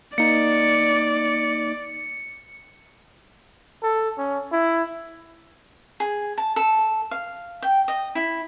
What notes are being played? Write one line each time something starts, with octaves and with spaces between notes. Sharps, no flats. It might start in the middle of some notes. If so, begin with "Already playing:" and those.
A#3 D#4 D5 C#7
A4
C#4
E4
G#4
A5
A4
F5
G5
D#5
E4